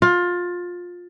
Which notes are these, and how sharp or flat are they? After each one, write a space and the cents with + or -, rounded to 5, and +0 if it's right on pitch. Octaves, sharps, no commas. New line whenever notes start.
F4 +20